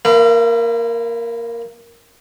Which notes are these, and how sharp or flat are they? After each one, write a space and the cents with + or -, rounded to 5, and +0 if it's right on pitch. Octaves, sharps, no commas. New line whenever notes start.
A#3 +0 B4 +20 F5 -45